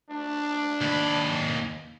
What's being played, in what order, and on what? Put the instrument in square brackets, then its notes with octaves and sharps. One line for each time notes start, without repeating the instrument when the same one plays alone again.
[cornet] D4
[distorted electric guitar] D#2 B5